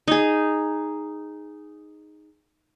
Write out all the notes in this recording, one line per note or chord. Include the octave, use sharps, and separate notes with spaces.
D#4 G#4